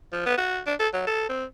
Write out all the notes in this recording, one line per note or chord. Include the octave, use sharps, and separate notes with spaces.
F3
B3
F#4
D4
A4
F#3
A4
C4